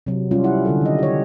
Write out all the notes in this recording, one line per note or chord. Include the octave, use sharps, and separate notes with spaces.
C3 F#3
G3 C#4 F4
E4 F#5
D3 G3 A4
D#3 D#5
G4 C#5